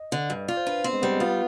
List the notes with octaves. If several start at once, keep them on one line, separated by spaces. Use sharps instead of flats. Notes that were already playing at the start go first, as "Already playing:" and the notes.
Already playing: D#5
D3
G2
F4 D5
C5
D4 B4
B3 C4
G#3
G3 B3
G#3
B3 F4